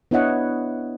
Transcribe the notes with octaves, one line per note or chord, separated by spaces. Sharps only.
B3 D4 E4 C#5 D#5 F#5